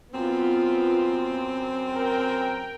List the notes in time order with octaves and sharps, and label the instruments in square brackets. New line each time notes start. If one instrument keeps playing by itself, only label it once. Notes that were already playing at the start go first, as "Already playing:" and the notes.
[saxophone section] F#2 C4 [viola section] B3 F4
[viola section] A#4 G5